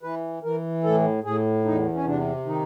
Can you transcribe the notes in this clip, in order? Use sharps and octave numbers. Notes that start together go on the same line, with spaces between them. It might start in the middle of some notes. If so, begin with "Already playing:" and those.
E3 B4
E3 A#4
A2 A4
A2 G#4
E2 D#4
C#4
C3 D4
D#3 D#4